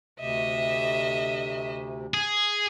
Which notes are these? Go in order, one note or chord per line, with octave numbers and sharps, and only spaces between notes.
D2 C3 D#5 E5
G#4